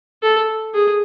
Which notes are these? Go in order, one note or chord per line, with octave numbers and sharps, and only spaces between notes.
A4
G#4